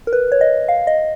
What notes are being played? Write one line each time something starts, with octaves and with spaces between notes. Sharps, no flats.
A#4
B4
C#5
D#5
F5
D#5